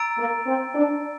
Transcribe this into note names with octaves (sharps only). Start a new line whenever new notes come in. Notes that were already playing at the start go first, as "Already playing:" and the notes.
Already playing: A#5 E6 A6 D7
A#3
C4
D4